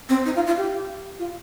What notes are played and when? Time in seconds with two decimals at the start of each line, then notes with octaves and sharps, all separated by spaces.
0.09 C4
0.25 D#4
0.36 F4
0.47 F4
0.57 G4
1.19 F4